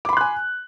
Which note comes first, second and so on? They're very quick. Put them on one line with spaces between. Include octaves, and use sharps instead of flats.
D6 B5 C6 F#6 G#5